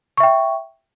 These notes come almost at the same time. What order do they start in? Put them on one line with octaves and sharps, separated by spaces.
C#6 E5 G5